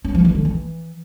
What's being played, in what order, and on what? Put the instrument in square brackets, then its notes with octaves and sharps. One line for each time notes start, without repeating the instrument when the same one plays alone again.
[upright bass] C#4
F3
E3
D3
E3